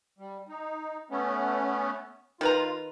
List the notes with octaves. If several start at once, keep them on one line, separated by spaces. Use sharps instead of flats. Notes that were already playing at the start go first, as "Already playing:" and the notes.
G3
D#4
A3 B3 C#4
D#3 F4 B4 A#5